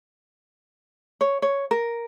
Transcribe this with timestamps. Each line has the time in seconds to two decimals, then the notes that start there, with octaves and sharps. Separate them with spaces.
1.21 C#5
1.42 C#5
1.71 A#4